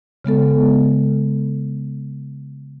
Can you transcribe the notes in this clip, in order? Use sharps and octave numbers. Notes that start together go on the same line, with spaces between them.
C#3 G#3 B3 A4